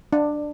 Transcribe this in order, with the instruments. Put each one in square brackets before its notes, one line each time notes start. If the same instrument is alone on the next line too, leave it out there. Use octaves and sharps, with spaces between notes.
[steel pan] D4